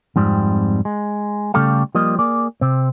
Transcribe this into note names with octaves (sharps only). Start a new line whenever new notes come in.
F2 G#2 G3 C4
G#3
C#3 G3 A3 G4 A4 F5
F3 G3 A#3 D#5
A#3 G#4 D5
C3 C4